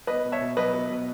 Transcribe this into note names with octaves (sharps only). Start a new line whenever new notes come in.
B3 B4 D#5
B2
C#5 E5
B2
F#3 B4 D#5
B3
B2